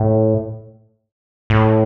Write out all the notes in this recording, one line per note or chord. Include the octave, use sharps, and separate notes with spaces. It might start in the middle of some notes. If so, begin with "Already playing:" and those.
Already playing: A2
A2